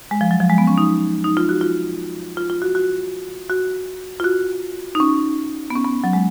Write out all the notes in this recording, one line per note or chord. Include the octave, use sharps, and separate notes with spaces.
G#3
F3
F#3
F3
G#3
B3
C#4
D#4
D#4
F4
F#4
F4
F4
F4
F#4
F#4
F#4
F4
F#4
D#4
C#4
B3
C#4
B3
F#3
G#3